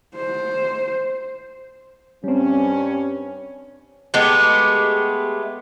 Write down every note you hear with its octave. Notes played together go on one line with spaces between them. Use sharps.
C5
G2 G3 C4 C#4
G#3 A3 B3 G4